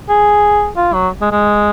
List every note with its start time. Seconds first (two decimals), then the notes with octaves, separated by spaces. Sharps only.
0.09 G#4
0.77 F4
0.93 F#3
1.21 G#3
1.32 G#3